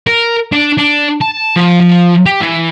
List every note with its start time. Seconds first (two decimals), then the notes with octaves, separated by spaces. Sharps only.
0.07 A#4
0.52 D4
0.78 D4
1.21 A5
1.56 F3
1.81 F3
2.26 G4
2.40 E3